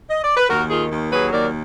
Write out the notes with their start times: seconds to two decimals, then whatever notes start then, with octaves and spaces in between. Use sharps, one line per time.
0.10 D#5
0.24 D5
0.37 B4
0.50 D#2 F#4 A#4
0.70 D#3 F4 G#4
0.91 D#2
1.12 F#3 G#4 B4
1.32 D#2 A#4 D5